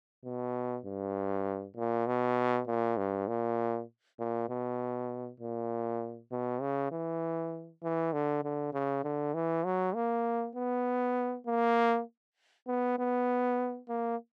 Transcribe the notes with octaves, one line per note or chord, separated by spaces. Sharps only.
B2
G2
A#2
B2
A#2
G2
A#2
A#2
B2
A#2
B2
C#3
E3
E3
D3
D3
C#3
D3
E3
F#3
A#3
B3
A#3
B3
B3
A#3